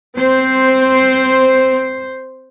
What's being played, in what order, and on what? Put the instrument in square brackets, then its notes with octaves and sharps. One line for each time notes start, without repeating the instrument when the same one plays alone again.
[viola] C4 [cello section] C5